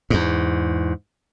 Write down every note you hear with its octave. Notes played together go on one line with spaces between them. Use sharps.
E2 G#2